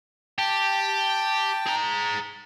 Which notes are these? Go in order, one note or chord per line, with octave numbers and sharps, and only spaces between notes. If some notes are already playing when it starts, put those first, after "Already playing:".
G4 G5 A5
G#4 A#5